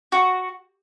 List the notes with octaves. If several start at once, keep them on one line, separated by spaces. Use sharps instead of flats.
F#4